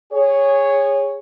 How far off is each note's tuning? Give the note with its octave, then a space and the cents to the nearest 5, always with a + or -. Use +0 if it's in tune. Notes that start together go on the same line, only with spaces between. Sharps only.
G#4 -25 C#5 +0